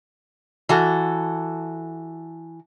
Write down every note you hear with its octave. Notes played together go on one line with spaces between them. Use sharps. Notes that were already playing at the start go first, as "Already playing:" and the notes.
E3 F#4 A4